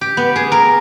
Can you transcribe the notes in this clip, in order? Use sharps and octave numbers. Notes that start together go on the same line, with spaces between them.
G4
B3
G#4
A#4